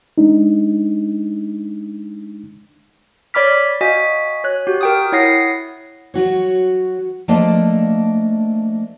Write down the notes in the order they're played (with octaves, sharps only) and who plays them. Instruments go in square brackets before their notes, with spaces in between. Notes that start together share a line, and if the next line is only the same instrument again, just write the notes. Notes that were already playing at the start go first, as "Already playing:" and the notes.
[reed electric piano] G#3 D4 D#4
[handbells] C#5 D5 B5 D6 F6 B6
F#4 D#5 F5 G#5 B6
C#5 F#6
F#4 G4
A#4 G5 D#6
E4 C#5 F#5 D#6 A#6 C7
[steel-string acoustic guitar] F#3 F#4 C#5
F3 A3 A#3 D4 D#5 A5